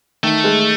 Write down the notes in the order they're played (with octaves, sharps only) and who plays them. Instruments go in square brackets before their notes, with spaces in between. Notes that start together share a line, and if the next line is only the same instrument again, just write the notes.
[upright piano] D#3 [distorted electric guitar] A3
[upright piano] G#3